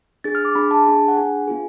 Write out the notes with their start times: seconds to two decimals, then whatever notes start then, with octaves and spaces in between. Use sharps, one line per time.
0.24 D4 G#4 A6
0.35 F6
0.45 D6
0.55 D4 G#4 B5
0.71 A5
0.86 D4 G#4
1.08 F#5
1.17 D4 G#4 G#5
1.48 B3 F4 G#4